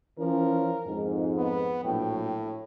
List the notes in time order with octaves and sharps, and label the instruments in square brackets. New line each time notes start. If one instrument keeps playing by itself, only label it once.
[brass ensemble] E3 F3 C#4 [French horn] A#4
[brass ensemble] F2 G#2
[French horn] B3
[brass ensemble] A#1 F#3 G5 [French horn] A2